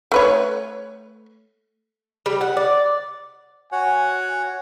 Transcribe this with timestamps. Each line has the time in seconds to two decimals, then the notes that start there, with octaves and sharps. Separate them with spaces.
0.12 A3 B4 C#5
2.26 G3
2.41 F#5
2.57 D5
3.72 F#4 C#5 F#5 G#5